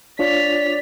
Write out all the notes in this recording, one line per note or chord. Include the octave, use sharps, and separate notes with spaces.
D4 F4 C#5 D5 B6 F7